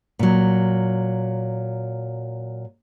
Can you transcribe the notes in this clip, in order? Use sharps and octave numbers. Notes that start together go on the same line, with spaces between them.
A#2 F#3